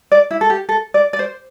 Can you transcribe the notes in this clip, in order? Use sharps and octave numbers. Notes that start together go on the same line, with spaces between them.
D5
E4
A4
G4
A4
D5
D5
C5